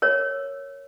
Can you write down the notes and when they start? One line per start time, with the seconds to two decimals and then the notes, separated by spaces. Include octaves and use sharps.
0.02 A#4 C#5